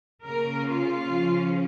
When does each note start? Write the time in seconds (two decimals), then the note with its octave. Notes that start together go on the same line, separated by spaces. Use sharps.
0.25 C#3 A#3 C#4 A#4
0.67 F4
1.09 C#3 F3 C#4